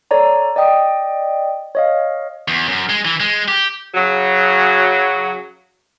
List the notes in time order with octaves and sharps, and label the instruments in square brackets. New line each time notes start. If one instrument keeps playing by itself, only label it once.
[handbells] A4 C#5 D5 A#5
D5 D#5 G5 D#6
C#5 D#5 F5
[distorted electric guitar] E2
F#2
G#3
E3
G#3
G4
[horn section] C#3 F#3